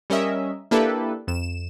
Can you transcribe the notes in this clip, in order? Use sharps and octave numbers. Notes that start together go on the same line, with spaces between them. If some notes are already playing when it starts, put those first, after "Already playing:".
G3 C#4 A#4 D#5 E5
A#3 D4 E4 G4 A4 B4
F2 E7